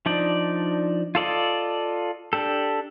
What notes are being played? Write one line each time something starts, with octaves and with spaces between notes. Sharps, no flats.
F3 D4 D#4 D5
F4 A4 D5 D#5
D4 G4 A4